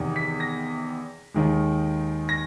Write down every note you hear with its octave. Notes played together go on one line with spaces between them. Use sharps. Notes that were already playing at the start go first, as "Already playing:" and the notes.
Already playing: E2 C3 D#3
B6
A#6
D#2 D#3 G#3
A#6